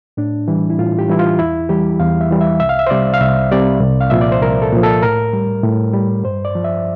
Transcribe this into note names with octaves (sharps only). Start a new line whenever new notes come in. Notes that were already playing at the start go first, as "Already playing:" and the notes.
A2 D4
E3 G3
E4
A2 F4
G4
E3 G3 E4
F4
E2 E4
E3 G3 G4
E2 F5
E5
E3 G3
E5
C2 E5
F5
E5
C5
C3 G3 D5
F5
C2 E5
C3 G3 D5
C2
F5
A#2 F3 E5
D5
C5
C2 A#4
A4
A#2 F3
A4
A2 A#4
G3
A2
G3
G2 C5
D5
F3
E5